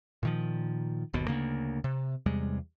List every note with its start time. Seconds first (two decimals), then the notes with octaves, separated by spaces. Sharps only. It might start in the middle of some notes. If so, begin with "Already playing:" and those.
0.23 A#2 D#3 F3
1.13 G1 D#2 B2
1.28 D2 C#3 A#3
1.84 C3
2.26 E2 C3 G3 G#3